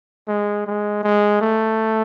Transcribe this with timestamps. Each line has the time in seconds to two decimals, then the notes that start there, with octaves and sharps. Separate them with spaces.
0.28 G#3
0.66 G#3
1.03 G#3
1.41 A3